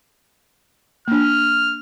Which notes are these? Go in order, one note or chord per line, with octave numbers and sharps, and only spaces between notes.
A#3 D4 F6